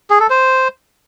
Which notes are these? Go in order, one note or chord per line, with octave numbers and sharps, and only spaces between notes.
G#4
A4
C5